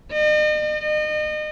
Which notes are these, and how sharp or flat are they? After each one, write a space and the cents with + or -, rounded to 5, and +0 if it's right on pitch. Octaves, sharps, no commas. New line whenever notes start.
D#5 -40
D#5 -35